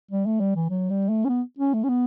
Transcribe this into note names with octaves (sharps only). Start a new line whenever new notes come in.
G3
A3
G3
E3
F#3
G3
A3
C#4
B3
C#4
A3
C#4
B3